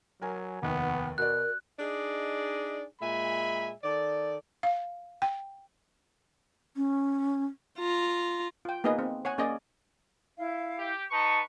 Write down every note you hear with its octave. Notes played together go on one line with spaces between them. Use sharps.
F#3 A#4 G#5
F1 D#2 B3 F#5
B2 F#4 A#4 D5 F#6
D4 D#4 G#4 D5 D#5
A#2 G#3 E5 G#5 B5
D#3 A4 D5
F5
G5
C#4
F4 A#5
F4 G5
A#3 B3 D#4 G#4 B4 D#5
C4
C#5 F#5 G#5
A#3 C#4 G#4 D5 D#5
E4 F5
G4
D#4 B4 A5 C#6